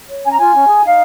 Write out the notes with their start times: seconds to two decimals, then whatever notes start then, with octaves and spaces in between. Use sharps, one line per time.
0.08 C#5
0.24 C#4 G#5
0.30 A#5
0.38 F4 G#5
0.53 C#4
0.67 G#4
0.83 D#4 F5